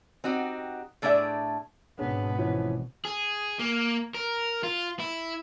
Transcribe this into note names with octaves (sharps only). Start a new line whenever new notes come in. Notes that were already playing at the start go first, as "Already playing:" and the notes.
C4 D#4 F#4 G4
A2 A3 D4 G#4 D5 E5
G#1 B2 B3 C#4 D4 G#4
E3 F3 C#4
G#4
A#3
A#4
F4
E4